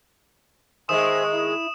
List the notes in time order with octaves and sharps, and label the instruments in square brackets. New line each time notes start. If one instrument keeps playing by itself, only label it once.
[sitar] D#3 G#3 [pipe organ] G#4 C5 E5 [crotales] D#6 E7
[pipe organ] E4